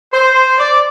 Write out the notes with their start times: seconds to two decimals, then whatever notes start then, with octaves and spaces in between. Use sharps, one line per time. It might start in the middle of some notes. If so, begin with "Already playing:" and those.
0.12 C5
0.58 D5